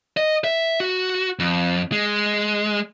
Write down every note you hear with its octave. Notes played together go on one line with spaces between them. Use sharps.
D#5
E5
F#4
F2
G#3